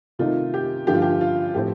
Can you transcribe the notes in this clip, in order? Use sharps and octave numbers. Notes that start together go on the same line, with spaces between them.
C3 D#3 A3 D#4 F4
G4
G2 D3 F3 A3 G4
F4
G4
F4
A2 F3 A3 C4 G4